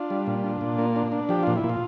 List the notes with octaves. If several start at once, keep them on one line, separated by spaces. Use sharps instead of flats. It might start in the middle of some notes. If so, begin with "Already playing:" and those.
Already playing: D4 F4
G3
A#2
D4
A#2
A#3
D4
D4
F3 G4
A#2 F4
E4
A#2
F4